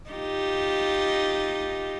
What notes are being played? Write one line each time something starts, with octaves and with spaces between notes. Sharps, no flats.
D#4 F4 G4